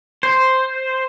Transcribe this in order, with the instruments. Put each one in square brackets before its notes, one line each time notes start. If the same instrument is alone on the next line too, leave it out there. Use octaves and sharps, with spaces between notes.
[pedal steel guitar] C5